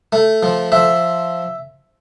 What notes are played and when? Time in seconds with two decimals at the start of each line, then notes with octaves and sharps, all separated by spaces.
0.12 A3
0.43 F3
0.72 F3 E5